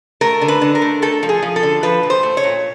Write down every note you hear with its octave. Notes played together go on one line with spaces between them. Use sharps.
A3 A#4
D3
B4
D3
A#4
A3
A3 A4
F3
G#4
F3
A4
D3
F3 B4
A#2
C5
A3
C#5
A#2